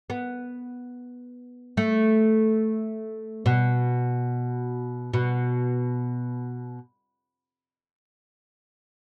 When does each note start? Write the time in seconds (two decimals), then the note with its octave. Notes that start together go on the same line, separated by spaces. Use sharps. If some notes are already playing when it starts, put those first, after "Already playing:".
0.10 B3
1.77 A3
3.46 B2
5.13 B2